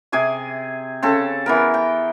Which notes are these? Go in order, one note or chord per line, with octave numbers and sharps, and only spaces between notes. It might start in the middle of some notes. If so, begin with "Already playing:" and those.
C3 G#4 G#5 D6
C#3 C4 A4
E3 B3 A#4
G5